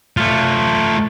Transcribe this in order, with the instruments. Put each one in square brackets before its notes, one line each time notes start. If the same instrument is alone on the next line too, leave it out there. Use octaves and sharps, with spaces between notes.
[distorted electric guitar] A3 F4